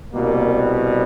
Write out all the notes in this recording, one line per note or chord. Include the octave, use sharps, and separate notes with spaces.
C2 B2 G3 A#3